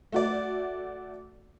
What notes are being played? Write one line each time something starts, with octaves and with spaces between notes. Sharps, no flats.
A3 F#4 D5